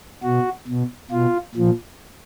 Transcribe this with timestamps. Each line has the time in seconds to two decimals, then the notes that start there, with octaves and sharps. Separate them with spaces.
0.23 B2 F#4
0.68 B2
1.11 B2 F4
1.55 A#2 F3